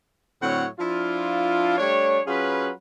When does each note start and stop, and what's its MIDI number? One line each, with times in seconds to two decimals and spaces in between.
0.42 0.65 45
0.42 0.65 50
0.42 0.65 54
0.42 0.65 60
0.42 0.65 73
0.42 0.65 78
0.79 1.78 53
0.79 1.78 62
0.79 1.78 64
0.79 1.78 65
1.78 2.20 55
1.78 2.20 57
1.78 2.20 62
1.78 2.20 73
2.27 2.69 54
2.27 2.69 61
2.27 2.69 65
2.27 2.69 68
2.27 2.69 71